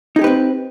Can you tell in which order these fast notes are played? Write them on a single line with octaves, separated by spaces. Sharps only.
D#4 G#4 G4 B4 C4